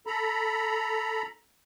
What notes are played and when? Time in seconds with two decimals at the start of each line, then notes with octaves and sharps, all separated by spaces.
0.07 A4 A#5 B5